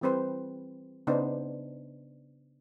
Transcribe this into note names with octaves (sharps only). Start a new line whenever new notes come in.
E3 G3 C4 B4 C5
C#3 B3 D4 D#4 C5